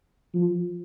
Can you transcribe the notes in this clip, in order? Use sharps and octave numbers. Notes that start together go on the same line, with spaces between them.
F3